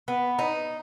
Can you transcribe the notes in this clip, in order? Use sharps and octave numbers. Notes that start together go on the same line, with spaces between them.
B3
D#4